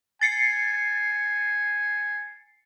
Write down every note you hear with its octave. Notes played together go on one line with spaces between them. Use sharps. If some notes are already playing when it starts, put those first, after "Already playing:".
G#5 A6 C7 C#7